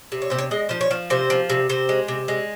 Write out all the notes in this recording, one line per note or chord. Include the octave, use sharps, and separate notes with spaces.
C3
C#5
C3 C5
C#5
G#3 D#5
F3 C5
C#5
F3
C3 C5
F3
C3
C3 C5
G#3
C3
G#3